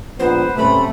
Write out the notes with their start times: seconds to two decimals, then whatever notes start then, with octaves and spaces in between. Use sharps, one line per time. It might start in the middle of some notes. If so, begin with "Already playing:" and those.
0.19 A#1 G#2 B3 B4 C5
0.58 G#2 C3 A3 C#4 B5